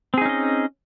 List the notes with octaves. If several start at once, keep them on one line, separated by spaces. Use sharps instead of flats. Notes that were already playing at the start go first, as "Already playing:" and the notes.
C4 C#4 D#4 G#4 D#5